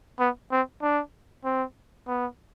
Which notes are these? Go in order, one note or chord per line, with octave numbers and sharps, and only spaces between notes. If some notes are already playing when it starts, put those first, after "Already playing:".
B3
C4
D4
C4
B3